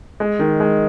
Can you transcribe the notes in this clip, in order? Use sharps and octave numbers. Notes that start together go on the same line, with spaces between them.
G#3
D#3
G#3